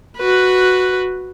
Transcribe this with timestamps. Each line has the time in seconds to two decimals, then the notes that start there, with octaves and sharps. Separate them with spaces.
0.18 F#4 B4